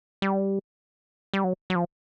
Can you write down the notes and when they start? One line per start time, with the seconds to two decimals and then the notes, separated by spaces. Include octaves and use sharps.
0.22 G3
1.33 G3
1.44 F#3
1.70 F#3
1.75 F3